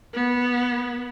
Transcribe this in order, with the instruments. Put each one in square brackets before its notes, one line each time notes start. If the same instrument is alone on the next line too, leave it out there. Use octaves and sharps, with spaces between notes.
[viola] B3